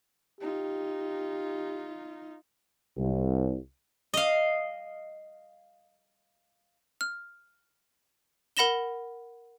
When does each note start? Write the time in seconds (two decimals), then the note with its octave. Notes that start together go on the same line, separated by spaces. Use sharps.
0.41 D#4 F4 G4
2.98 C2
4.14 D#5 F5
7.01 F6
8.57 A#4 F#5 B5 A#6 E7 G7